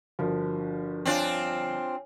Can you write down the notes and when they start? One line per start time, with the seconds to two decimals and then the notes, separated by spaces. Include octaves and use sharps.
0.19 G1 F3 D4 F#4 A#4
1.06 C4 D4 F4 C#5 G#5